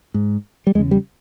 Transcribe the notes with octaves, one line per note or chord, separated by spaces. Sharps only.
G#2
G3
E2 C#3 G#3
G3